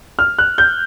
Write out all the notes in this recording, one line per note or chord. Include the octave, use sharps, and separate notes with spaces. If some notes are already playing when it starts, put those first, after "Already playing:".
F6
F#6
G6